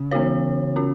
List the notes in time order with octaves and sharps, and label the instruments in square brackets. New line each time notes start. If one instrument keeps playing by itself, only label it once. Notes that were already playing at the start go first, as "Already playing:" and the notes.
Already playing: [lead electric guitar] C#3
[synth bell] E3 B3 F#4 C#5
C#4 F#4